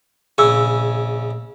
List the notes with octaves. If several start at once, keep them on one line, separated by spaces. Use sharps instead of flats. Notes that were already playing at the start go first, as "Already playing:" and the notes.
A#1 C#3 G#4 G#5 E6